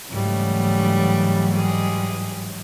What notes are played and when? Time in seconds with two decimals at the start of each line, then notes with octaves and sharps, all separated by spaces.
0.10 G#2 C#3 E3 F#3 G3 A3
1.52 G3 G#3 G#4